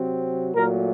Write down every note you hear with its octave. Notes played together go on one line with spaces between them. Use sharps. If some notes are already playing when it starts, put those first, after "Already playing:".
Already playing: C3 F#3 C4
A#2 F#3 A3 A#4